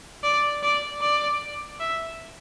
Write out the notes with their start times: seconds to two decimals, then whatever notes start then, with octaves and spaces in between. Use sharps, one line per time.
0.23 D5
0.63 D5
1.01 D5
1.80 E5